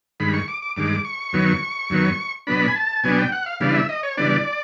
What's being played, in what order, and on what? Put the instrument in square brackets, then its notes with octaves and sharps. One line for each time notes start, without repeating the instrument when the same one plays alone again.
[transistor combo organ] G2 D#3 G#3 B5
C#6
D6
D6
G2 D#3 G#3 D6
C#6
F#2 D#3 F#3 B3
F#2 D#3 F#3 B3
B2 F#3 B3 D4 B5
G#5
A5
B2 F#3 B3 D4 G#5
G5
F#5
F5
C#3 E3 G3 B3 D4 F5
E5
D#5
C#5
C#3 E3 G3 B3 D4 D5